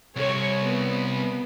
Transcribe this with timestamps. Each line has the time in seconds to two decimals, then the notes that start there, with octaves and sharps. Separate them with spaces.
0.16 C2 C3 C#5
0.62 B3